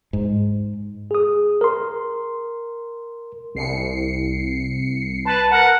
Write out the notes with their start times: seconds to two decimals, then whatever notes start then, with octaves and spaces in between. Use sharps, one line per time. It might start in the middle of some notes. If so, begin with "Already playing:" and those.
0.13 G#2
1.11 G#4 D#6
1.61 A#4 C6
3.55 C2 C7 C#7
5.25 B4 A5 F#6
5.51 A#4 F#5